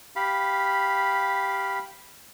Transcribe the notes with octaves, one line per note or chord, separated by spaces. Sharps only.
G4 F5 B5